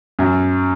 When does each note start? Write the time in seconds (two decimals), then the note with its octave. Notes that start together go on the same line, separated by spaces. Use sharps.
0.19 F#2